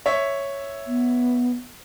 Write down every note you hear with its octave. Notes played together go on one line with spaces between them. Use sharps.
C#5 E5
B3